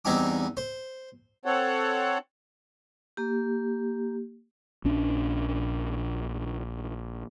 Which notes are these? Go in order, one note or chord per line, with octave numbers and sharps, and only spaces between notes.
E2 G3 C4 D#4 G#5 D6
C5
C4 A4 C#5 F#5
A#3 G4
A#1 C#4 D4